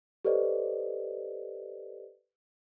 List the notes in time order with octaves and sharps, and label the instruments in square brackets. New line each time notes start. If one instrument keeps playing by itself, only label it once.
[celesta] G4 A4 B4 C5 D5 D#5